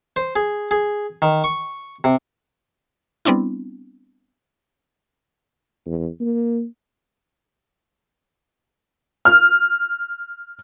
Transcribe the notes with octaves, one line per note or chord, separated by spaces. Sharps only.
C5
G#4
G#4
D#3
C#6
C3
G3 B3 C4 D4 E4
E2
A#3
F6